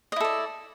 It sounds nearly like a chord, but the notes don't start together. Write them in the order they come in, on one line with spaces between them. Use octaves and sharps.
D#5 E4 A4 D5